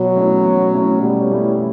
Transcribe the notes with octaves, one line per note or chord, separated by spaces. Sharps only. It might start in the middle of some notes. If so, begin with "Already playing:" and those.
Already playing: B2 F#3
A3 C#4 E4
B2
A3 C#4 E4
B2 G3
A3 C#4 E4